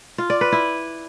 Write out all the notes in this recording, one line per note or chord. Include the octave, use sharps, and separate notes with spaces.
F4
D5
B4
E4